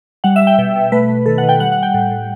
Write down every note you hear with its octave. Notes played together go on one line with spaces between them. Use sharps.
G3 F#5
E5
G3
G5
B2 G5
B2
A3 B4
A3
D#3 A4
F#5
D#3
G5
G3 F#5
F#5
G3
G5
A2
A2